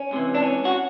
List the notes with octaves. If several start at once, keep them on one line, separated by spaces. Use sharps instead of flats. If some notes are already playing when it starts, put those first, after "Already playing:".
Already playing: C#4
C#2 C3 E3
D4
C#4
F#4